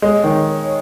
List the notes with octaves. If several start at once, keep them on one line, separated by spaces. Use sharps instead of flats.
G#3 C#5
D#3